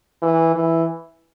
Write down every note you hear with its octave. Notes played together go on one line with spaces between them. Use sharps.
E3
E3